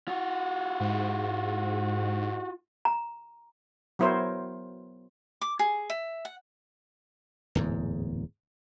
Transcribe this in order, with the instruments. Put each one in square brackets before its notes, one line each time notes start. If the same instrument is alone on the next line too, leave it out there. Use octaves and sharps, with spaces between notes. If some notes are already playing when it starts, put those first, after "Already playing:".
[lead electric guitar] F4 F#4
[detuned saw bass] G#2
[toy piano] A#5
[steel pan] F#3 B3 E4 A#4 C5 C#5
[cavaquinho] D6
G#4
E5
F#5
[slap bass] D1 E2 G#2